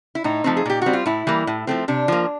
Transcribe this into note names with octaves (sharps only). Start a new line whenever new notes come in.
E4
A2 D#4
F3 A3 C4
G#4
A#2 G4
G3 C4 F#4
F4
A2 E4
E3 G3 A#3
A2
F3 A3 C4
C3 D4
F3 A#3